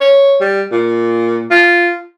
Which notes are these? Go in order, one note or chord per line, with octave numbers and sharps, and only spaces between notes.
C#5
G3
A#2
F4